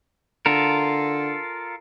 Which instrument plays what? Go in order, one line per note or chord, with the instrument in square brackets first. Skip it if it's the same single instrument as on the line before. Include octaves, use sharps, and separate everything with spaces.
[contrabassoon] D3 [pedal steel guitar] F4 A4 A#4